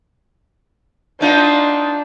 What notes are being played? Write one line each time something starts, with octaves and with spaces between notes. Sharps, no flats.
B3 D4 D#4 F4